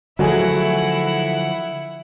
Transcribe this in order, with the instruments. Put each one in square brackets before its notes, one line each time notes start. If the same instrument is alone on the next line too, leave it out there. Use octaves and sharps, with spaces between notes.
[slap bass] D3 F3 [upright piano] F#3 A3 G#4 [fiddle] E4 F#5